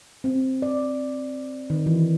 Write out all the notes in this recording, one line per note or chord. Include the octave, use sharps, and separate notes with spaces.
C4
D5
D#3
E3